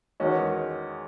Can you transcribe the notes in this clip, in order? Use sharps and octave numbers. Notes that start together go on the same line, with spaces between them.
E2 D#3 G#3 C#4 F#4